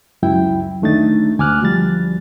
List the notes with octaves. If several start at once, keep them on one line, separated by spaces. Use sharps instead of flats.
C#2 F#2 F#3 E4 G5
D2 D#3 A3 D4 D#4 A6
D2 G#5 D6 F6 F#6
D2 F3 G3 A6